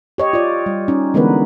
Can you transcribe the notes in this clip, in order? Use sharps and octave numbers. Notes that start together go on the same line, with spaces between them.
G4 C#5 D#5
F4 D5
G3
C#4 D#4
D3 E3 G#3 B3 A#4 B4